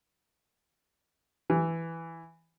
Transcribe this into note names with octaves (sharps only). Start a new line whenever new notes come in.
E3